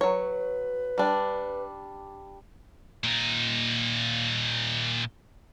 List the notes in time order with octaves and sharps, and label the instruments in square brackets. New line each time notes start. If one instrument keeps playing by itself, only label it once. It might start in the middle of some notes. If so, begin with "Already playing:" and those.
[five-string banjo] F#3 C#5 [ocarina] B4
[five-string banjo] G3 D4
[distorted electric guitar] A#2 D#4